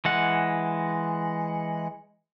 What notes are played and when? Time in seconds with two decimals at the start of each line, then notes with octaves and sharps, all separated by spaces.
0.05 E3 G#3 F#5